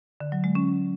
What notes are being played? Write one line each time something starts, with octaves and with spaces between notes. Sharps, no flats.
D3
F#3
G#3
C#4